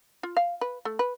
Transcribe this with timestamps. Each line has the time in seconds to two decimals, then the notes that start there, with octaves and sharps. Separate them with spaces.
0.23 F4
0.37 F5
0.61 B4
0.85 A3
0.99 B4